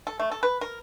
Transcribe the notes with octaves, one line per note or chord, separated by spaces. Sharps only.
A4
A3
A4
B4
A#4